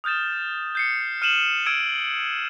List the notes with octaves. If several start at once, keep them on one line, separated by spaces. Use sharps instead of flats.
D#6 F6 G6 A6 E7
G6 C7 C#7
F6 D#7 E7 F#7
E6 G#6 D7 D#7